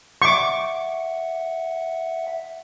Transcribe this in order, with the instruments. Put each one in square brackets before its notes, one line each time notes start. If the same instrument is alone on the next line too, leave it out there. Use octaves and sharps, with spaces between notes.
[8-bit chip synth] E5 F#5 [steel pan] C#6 D6